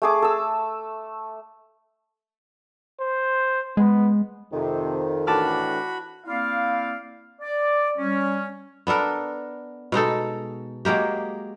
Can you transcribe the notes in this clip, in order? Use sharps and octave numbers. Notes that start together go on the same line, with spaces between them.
A3 G#4 D6
A4 E6
C5
G#3 B3
F2 C3 D#3
A2 E3 D4 F#4 A5 B5 D6 F6
A#3 C4 E4 D5 F5
D5
G3 C#4
B3 D4 A4 A#4
B2 G#3 D#4 A4
F#3 G#3 A#3 G4